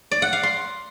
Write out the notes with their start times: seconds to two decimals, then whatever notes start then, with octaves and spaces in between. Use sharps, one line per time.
0.11 D5
0.22 F#5
0.33 F5
0.43 C6